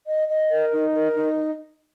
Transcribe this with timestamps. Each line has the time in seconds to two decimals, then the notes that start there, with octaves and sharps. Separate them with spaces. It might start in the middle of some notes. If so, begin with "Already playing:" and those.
0.06 D#5
0.28 D#5
0.50 A#4
0.72 D#4
0.93 A#4
1.15 D#4